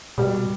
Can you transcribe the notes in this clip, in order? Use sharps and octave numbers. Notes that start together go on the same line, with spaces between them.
B2 G3